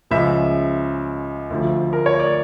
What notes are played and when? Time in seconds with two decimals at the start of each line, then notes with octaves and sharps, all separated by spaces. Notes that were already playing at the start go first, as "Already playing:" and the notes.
0.11 C#2 C#3 F3 E5
1.50 D2 D3 F3
1.93 A#4
2.06 C#5
2.20 D5